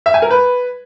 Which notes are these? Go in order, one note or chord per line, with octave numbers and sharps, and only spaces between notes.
E5
G#5
A#4
B4